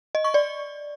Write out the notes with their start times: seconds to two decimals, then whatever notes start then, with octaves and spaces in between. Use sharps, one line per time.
0.15 D#5
0.24 C#6
0.34 D5